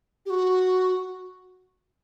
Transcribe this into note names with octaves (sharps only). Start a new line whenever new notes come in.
G4
F#4